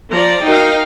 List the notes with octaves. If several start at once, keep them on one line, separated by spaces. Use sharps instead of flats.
F3 D5 A#5
D#4 F#4 A#4 F5 G5